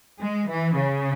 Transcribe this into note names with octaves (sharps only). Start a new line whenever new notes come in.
G#3
E3
C#3